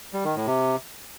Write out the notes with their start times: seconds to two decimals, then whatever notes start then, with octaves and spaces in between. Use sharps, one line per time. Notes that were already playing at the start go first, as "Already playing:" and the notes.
0.13 G3
0.24 D#3
0.36 A2
0.47 C3